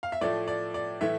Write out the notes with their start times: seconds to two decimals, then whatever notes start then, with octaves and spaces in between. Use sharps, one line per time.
0.03 F5
0.12 E5
0.21 A2 F3 A3 D5
0.48 D5
0.74 D5
1.01 A2 E3 A3 E5